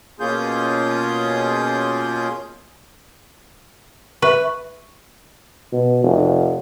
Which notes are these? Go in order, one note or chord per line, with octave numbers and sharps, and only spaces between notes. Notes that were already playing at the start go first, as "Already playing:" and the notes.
B2 A#3 C#4 F4 G#4 G6
B4 E5 C#6
B2
F1